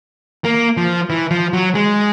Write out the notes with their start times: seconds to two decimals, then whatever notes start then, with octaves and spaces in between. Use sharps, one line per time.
0.44 A#3
0.77 F3
1.10 E3
1.31 F3
1.53 F#3
1.75 G#3